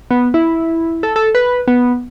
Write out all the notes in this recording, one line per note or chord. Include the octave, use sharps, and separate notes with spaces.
B3
E4
A4
A4
B4
B3